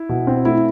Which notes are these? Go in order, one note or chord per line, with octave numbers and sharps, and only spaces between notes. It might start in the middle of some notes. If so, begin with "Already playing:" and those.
Already playing: E4
B2
C4
A3 E4